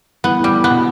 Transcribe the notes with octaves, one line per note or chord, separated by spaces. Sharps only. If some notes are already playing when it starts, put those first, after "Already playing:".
E3 B3
A2
G3
B3
B2